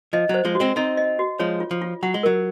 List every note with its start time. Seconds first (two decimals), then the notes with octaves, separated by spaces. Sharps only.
0.13 F3 D#5
0.29 F#3 C5
0.45 F3 G#3
0.55 F#4
0.60 G#3 C4
0.76 C4 D#4 D#5
0.97 D#5
1.19 F#4
1.39 F3 G#3 C#5
1.60 F4
1.71 F3
1.82 F4
2.03 F#3 F#5
2.14 G#3
2.23 F#3 A#4